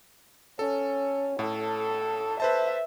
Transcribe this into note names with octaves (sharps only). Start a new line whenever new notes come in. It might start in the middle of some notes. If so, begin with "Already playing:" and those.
C#4 A4
A2 A4
B4 C5 E5 A5